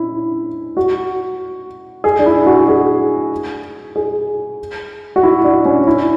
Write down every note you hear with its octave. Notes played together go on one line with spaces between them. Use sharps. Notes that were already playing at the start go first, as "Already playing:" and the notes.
Already playing: C#4 D4 E4
F#4
G#4
D4
E4
F#4
G#4
G#4
F#4
E4
D4
C#4
E4